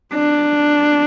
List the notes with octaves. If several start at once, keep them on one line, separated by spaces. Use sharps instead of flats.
D4